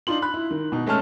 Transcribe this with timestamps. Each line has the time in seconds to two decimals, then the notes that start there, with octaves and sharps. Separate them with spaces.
0.07 D4 D#4 F4 C6 F#7
0.22 B5 F#6
0.34 E4
0.51 D#3
0.72 B2 D#4
0.87 G#3 A3 C#4 A5 F6